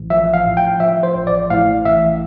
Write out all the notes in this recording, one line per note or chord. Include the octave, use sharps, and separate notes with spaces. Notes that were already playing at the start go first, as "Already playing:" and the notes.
Already playing: A1
F3 E5
F5
A2
G5
F3 E5
C5
A1
D5
A2 F5
A1 E5